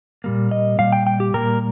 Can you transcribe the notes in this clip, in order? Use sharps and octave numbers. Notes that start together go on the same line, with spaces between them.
A#2 G3 A#3
D#5
A#2 G3 F5
G5
G5
G4
A#2 G3 A#3 A#4